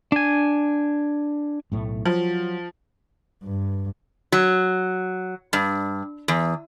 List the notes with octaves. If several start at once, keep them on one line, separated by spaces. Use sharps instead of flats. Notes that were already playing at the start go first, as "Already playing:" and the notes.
D4 G#5
B1 A2 A3
F3 F#3
G2
F#3
G2
E2